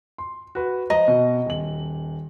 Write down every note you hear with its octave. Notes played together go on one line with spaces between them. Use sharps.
C6
F#4 B4
F3 D#5 A#5 A#6
B2
D#1 F#7